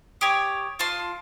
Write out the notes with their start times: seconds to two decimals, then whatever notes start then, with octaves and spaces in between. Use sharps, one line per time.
0.21 G4 C#5 D#6 D7
0.79 F4 A5 C6